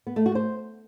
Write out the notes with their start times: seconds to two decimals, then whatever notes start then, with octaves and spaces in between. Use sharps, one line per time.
0.07 B3
0.16 A3
0.26 F#4
0.35 C5